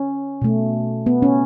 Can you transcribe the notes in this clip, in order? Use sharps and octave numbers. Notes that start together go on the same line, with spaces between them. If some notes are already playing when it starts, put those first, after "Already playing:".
Already playing: C#4
B2 A3
B3
C#4